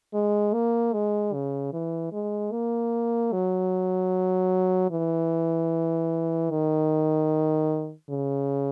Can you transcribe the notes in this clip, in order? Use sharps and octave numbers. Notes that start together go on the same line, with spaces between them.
G#3
A#3
G#3
C#3
E3
G#3
A#3
F#3
E3
D#3
C#3